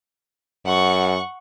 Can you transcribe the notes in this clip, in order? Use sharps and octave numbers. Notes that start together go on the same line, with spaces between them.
F#2 F#5 C#6